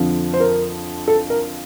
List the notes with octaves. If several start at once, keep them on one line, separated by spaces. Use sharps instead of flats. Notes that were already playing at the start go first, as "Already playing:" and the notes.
Already playing: F2 D3 F3
C5
A#4
A4
A#4